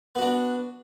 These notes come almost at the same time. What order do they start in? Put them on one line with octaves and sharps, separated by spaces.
B3 F#4 D4